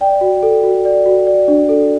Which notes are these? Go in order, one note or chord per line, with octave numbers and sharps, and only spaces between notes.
D5 G5
F#4
A4
F#4
D5
F#4
D5
D4
A4